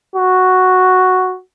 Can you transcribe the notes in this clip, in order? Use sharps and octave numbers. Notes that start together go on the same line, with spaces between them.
F#4